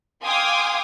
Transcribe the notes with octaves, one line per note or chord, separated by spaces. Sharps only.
F5 G5 G#5 C6 D6 D#6